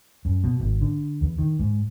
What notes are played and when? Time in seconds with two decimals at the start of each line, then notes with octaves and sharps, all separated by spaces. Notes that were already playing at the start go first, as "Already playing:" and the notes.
0.25 F#2
0.44 B2
0.60 G#1
0.81 D3
1.21 E2
1.38 D#3
1.59 G#2